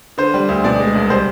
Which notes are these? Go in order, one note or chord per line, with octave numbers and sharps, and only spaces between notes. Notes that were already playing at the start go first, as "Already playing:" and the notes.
D3 C5
G3
D2
B2 D5
G#3
C2
G3 C5